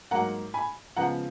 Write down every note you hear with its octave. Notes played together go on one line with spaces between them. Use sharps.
G#2 F#3 A#3 F#5 A#5
G#5 B5
C#3 F3 G#3 B3 F#5 A#5